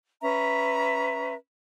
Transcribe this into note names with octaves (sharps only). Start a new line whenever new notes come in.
C#4 B4 E5 A#5